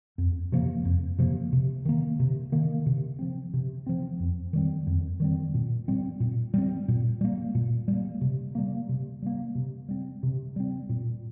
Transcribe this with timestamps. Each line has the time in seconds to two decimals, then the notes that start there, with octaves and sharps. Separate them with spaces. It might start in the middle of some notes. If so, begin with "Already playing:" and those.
0.18 F2
0.52 C3 F3 A#3
0.85 F2
1.19 C3 F3 A#3
1.53 C3
1.85 D#3 A#3
2.20 C3
2.52 D#3 A#3
2.86 C3
3.19 F3 C4
3.54 C3
3.87 F3 C4
4.20 F2
4.53 D#3 G3 C4
4.87 F2
5.20 D#3 G3 C4
5.54 A#2
5.88 G3 C4
6.20 A#2
6.54 G3 C4
6.88 A#2
7.21 G3 A#3
7.55 A#2
7.88 G3
7.93 A#3
8.21 C3
8.55 G3 A#3
8.89 C3
9.22 G3 A#3
9.55 C3
9.89 G3 C4
10.23 C3
10.56 G3 C4
10.89 A#2